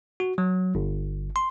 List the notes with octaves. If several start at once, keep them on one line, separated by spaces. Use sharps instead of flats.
F#4
F#3
G1
C6